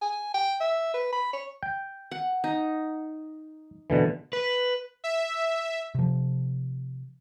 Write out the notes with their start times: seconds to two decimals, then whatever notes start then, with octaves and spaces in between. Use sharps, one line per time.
0.02 G#5
0.34 G5
0.60 E5
0.94 B4
1.12 B5
1.33 C#5
1.63 G5
2.11 F#5
2.44 D#4
3.90 B2 D3 E3
4.33 B4
5.04 E5
5.95 C3 F3